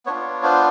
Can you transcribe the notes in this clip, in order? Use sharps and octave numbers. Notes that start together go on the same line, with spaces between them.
B3 D4 F4 C#5
C5